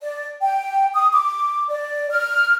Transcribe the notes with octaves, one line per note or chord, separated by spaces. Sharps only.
D5
G5
D#6
D6
D5
F6